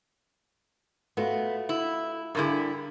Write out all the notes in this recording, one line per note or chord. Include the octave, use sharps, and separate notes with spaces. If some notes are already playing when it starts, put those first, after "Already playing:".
A3 B3 F4 F#4
E4
G2 D3 E4 G#4 A#4